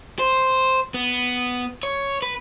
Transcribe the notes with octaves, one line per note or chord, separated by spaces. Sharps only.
C5
B3
C#5
B4